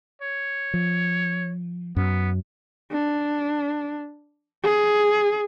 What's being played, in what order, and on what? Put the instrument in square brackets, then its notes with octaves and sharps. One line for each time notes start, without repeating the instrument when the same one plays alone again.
[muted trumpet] C#5
[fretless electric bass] F3
[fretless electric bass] F#2 [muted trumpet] B3
[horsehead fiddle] D4
G#4